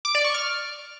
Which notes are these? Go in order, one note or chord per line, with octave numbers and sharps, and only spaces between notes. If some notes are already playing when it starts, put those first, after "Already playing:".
D6
D5
C#6
F6